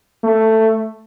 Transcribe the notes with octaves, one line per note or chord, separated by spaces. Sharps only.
A3